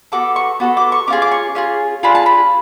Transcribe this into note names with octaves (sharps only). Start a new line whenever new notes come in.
B3 F#4 A4 D6
C#6
B3 F#4 A4
D6
C#6
C#4 F4 G#4 D6
D6
C#6
C#4 F4 G#4
D4 F4 G#4 B5
A5
B5